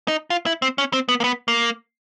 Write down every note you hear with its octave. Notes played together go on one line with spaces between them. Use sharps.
D#4
F4
E4
C4
C#4
C4
B3
A#3
B3
A#3